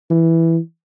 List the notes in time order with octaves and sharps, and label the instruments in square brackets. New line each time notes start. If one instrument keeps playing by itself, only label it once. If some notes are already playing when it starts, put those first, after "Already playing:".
[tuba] E3